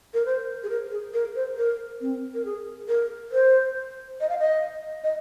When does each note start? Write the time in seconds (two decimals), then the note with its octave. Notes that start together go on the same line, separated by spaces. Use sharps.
0.14 A#4
0.25 C5
0.63 G#4
0.70 A#4
0.91 G#4
1.13 A#4
1.35 C5
1.57 A#4
2.01 C4
2.34 A#4
2.45 G#4
2.88 A#4
3.32 C5
4.20 D#5
4.29 F5
4.39 D#5
5.04 D#5